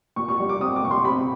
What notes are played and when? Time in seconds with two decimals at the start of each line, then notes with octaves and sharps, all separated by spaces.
0.16 A#2 C#6
0.28 C#6
0.39 G3
0.49 D6
0.60 C4 D#6
0.76 D6
0.83 A#2 C#6
0.91 C6
1.05 C4 B5